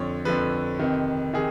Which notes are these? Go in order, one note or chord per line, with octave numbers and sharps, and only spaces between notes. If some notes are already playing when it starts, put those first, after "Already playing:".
Already playing: F2 D3 F3 C#5
F2 D3 F3 B4
F2 C3 D#3
C3 D#3 G#4